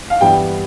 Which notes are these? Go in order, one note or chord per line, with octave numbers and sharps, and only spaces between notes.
F5
G2 E3 G3 B3 E4 G5